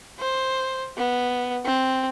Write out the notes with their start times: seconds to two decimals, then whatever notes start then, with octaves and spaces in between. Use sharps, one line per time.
0.19 C5
0.97 B3
1.65 C4